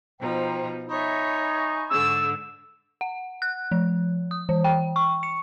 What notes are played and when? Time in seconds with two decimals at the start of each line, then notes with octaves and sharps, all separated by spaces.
0.21 B2 F3 D#4 C5 G5 A#5
0.89 D#4 C#5 E5 G#5 B5 C#6
1.90 G#2 D3 E6
3.01 F#5
3.42 F#6
3.72 F3
4.31 D#6
4.49 E3
4.64 G5
4.96 C#6
5.23 C#7